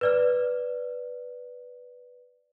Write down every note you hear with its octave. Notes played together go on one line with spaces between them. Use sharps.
B4 D5 F6